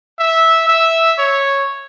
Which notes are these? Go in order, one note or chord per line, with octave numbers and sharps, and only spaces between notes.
E5
E5
C#5